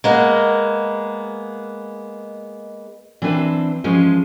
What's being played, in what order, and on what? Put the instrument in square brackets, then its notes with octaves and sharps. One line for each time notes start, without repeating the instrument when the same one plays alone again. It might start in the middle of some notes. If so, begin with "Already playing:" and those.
[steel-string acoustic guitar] G#3 A#3 B3
E3 C4 D4 B4 C5 E5
E3 F3 G#3 C#4 C5